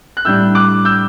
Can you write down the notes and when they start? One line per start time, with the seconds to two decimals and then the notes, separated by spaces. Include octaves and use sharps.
0.17 F#6
0.25 A2 G3 D4 E6 G6
0.55 D6 F#6
0.85 E6 G6